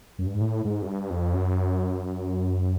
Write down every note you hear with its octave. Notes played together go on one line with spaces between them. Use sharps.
F#2
G2
G#2
A2
G#2
F#2
G2
F2
F#2